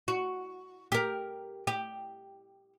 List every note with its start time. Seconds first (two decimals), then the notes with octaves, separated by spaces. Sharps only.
0.08 F#4
0.92 G4 A#4
1.67 G4